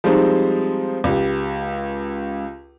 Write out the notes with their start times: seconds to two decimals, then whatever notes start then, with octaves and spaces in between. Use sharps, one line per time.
0.04 F3 G3 G#3 C4 D#4
1.04 C#2 G4